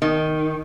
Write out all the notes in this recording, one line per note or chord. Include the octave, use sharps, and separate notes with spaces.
D#3